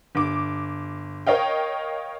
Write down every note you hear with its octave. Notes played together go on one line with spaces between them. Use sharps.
G1 D6
A#4 C#5 D#5 F5 G5